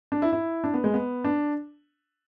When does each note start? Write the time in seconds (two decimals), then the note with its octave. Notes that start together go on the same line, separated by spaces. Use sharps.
0.12 D4
0.22 E4
0.33 E4
0.64 D4
0.74 B3
0.84 G#3
0.94 B3
1.24 D4